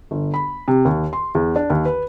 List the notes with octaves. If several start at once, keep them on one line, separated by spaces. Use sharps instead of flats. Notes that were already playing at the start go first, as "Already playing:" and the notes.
G1
B5
C3
D#2
C6
E2
D4
D#2
B4